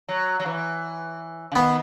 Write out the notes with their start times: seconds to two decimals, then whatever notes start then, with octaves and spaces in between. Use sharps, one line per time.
0.08 F#3
0.40 F#3
0.46 E3
1.52 C#3
1.56 D#3 B3